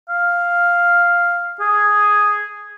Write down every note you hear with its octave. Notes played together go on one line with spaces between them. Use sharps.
F5
G#4